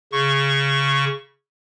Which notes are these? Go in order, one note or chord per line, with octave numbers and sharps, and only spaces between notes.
C#3 C#6